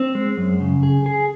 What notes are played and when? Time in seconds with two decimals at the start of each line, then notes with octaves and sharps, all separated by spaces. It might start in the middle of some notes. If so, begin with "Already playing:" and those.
Already playing: C4
0.15 G#3
0.37 F#2
0.60 C#3
0.83 G#4
1.06 G#4